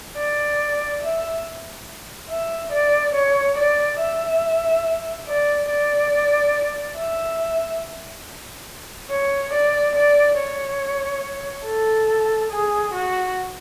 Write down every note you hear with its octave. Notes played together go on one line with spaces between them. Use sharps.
D5
E5
E5
D5
C#5
D5
E5
D5
D5
E5
C#5
D5
D5
C#5
A4
G#4
F#4